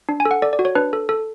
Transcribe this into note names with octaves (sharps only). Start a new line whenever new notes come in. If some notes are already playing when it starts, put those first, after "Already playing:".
D4
G#5
A4
F#5
A4 D5
D5
F#4
C#5
D4 B4
A4
A4